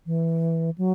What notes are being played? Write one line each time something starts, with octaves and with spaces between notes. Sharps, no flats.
E3
F#3